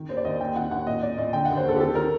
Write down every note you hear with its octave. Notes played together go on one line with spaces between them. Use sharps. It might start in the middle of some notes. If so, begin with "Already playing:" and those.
Already playing: D#3
D#2 C5
D5
D#2 D#5
D#2 G5
D#3 F#5
D#2 F#5
A#2 D#5
A#2 D5
A#2 D#5
D3 G5
D#2 F#5
C5
D#2 A4
G4
D#3 A4
D#3 A#4